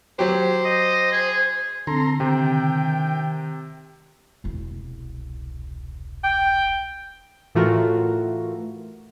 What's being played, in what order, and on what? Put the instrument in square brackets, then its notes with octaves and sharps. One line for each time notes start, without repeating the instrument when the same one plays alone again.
[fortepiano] F#3 G4 [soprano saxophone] C5
[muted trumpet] D#5
G#4
[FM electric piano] D3 [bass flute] C4 [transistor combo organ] A4 A#5 C6
[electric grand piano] C3 [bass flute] D#3 [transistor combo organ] G5
[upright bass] E1 C2
[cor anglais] G5
[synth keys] A2 E3 A3 F4 F#4 A#4